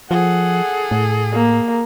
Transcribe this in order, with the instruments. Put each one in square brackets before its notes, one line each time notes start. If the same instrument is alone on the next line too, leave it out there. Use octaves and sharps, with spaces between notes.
[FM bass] F3 [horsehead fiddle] G#4 A4 [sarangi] F#5
[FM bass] A2
[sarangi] A#3